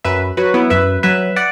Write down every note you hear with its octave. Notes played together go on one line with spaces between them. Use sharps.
F#2 B4 E5
F#3 F#4 B4
B3 E4
F#2 B4 E5
F#3 B4 E5
D5 F#5